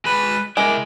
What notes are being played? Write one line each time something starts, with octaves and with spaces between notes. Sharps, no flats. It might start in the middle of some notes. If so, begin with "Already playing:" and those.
G#3 B4 B5
G#3 E4 A#4 D6